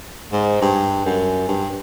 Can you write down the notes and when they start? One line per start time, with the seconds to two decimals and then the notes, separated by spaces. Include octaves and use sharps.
0.32 G#2
0.62 G2
1.06 F#2
1.48 G2